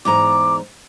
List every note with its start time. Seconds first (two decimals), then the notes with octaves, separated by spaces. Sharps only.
0.05 E2 G#2 A#5 D6